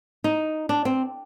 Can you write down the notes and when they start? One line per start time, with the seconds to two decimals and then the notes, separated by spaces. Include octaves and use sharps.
0.24 D#4
0.69 D4
0.85 C4